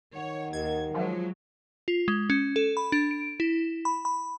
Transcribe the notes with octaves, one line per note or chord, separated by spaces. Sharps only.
D#3 C#5 F#5
D#2 A#4 D#5 F#5 G#6
F3 F#3 G#3
F4
G#3
C#4
A4
B5
D4
D7
E4
B5
B5